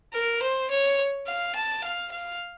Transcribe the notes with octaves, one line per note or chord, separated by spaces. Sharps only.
A#4
C5
C#5
F5
A5
F5
F5